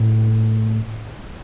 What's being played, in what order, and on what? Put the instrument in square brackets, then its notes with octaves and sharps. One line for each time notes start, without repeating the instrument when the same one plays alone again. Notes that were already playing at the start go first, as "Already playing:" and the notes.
Already playing: [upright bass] A2